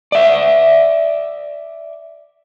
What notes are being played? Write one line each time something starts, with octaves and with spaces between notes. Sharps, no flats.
D5 E5